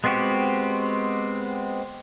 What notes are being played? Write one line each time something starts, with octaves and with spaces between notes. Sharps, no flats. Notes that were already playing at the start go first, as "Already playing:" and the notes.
G#3 B3 C4 F#4 G4